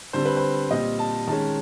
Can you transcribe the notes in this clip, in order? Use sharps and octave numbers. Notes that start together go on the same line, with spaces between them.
D3 G3 C4 C5
B4
C5
A#2 G3 C4 D#5
A5
D#3 G#3 C#4 A5